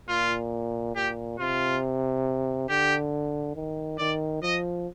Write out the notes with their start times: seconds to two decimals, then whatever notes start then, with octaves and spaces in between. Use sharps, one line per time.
0.08 A#2 F4
0.95 A#2 G4
1.39 C3 F4
2.69 D3 G4
3.56 D#3
3.98 D#3 D5
4.42 F3 D#5